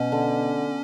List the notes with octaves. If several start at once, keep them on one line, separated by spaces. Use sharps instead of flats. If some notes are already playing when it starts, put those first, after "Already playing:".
Already playing: B2 C#4
D3